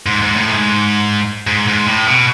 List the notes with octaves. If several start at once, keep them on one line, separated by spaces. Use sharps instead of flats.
G#2
G#2
A2
G#2
G#2
G#2
A2
B2